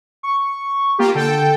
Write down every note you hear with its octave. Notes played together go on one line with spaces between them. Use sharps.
C#6
A#3 F4 G4
D3 A4 G5